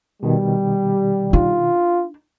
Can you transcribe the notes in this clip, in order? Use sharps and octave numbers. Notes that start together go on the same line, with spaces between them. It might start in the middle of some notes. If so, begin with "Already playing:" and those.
B2 D#3 G3
D4 D#4 F4